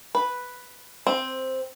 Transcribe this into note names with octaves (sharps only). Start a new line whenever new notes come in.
B4
C4